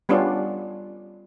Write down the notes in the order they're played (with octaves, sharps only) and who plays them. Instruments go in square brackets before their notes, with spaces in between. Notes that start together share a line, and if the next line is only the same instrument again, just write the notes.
[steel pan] G3 B3 C#4 D4 F4